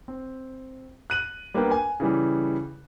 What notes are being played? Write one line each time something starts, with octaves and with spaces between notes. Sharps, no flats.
C4
F#6 D#7 F#7
G3 A#3 B3 D4 B4 G5
G#5
C#3 E3 G3